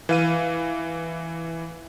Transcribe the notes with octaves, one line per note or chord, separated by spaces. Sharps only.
E3 F5 D#7